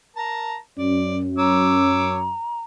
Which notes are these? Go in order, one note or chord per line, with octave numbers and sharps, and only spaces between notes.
A#4 A5 A#5
F#2 C#4 D5
C#5 A#5 D6 E6